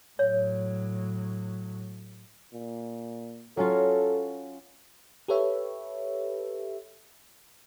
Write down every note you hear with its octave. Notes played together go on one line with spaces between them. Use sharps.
A2 F#3 C#5
A#2
F#3 C#4 F4 A4
G4 A4 B4 C#5 E5